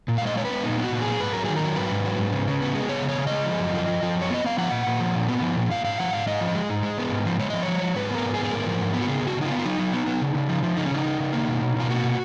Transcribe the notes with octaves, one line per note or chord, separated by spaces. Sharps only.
A#2
F5
G#3
D#5
G#3 C#5
B4
B3
A#2 D#4
B3
F#4
A#2
G#4
A#2
G#2 B4
F#3 A#4
D#3 G#4
A#4
F#3
G#2 B4
G#2
F#3
G#2
C#3
C#3
B3
G#3
B3 C#5
C#3
C#5
C#3
G#3 D#5
F3
F#2
F3
F3
F3
F#2
C#5
B3 D#5
B3 F5
F3 F#5
A#2
A#2
F3
A#2
B3
F3
A#2
G#2 F5
G#2 F5
F3 F#5
G#2 F5
G#2 D#5
F3
G#3
G#2
G#3
B3
G#2
F3
G#3 C#5
F3 D#5
C#5
F3
F3
G#2 B4
B3 A#4
G#2
G#4
B3
G#4
G#2 A#4
F3
G#2
B3
F#4
C#3 G#4
C#3 F#4
C#3 D#4
F4
B3
F4
F#3 D#4
F#3
B3
B3
C#3
C#3
F3
F3
C#3 D#4
C#4
C#3 D#4
C#3
C#3
A#3
B2
B2
B2 F4
A#3 F#4
B2